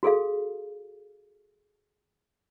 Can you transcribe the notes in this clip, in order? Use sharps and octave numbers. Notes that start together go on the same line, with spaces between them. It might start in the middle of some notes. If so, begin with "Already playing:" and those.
F#4 G#4 A4 F5